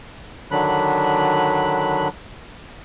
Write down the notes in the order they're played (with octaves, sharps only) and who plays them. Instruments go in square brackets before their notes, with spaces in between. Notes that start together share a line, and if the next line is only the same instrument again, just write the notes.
[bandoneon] D3 D#3 F#3 D4 B5 F#6